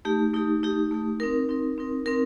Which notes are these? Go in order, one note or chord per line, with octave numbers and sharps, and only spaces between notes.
A3 D#4 G4
A3 D#4 G4
A3 D#4 G4
A3 D#4 G4
C4 D#4 A#4
C4 D#4 A#4
C4 D#4 A#4
C4 D#4 A#4